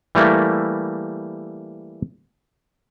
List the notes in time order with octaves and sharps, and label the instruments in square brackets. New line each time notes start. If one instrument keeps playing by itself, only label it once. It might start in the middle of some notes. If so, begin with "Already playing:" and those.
[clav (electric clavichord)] E3 G3 A3 A#3 E4